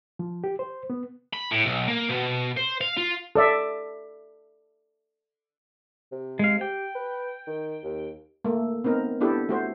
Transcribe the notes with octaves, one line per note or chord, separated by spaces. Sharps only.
F3
G4
C5
B3
B5
A2
B1
A#3
B2
C5
F5
F4
A4 D5 E5
C3
G#3 F5
G4 G5
B4
D#3
D#2
A3 A#3
B3 C4 D#4 A#4
B3 D4 E4 G4 A4
A3 F#4 C5